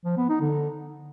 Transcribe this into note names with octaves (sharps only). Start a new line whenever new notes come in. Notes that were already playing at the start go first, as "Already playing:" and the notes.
F3
B3
D#4
D3